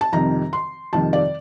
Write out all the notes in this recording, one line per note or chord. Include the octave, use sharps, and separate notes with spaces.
A5
F2 C3 D#3 G3 A#5
C6
F2 C3 D#3 G3 A5
D5